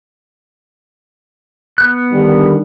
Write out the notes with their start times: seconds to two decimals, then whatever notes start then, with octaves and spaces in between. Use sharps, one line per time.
1.78 B3 F#6
2.12 D3 D#3 G3